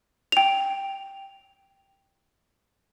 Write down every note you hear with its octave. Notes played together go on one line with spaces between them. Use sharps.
G5 F7